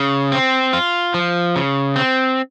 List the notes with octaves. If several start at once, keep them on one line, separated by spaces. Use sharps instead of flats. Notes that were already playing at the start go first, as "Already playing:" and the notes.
Already playing: C#3
C4
F4
F3
C#3
C4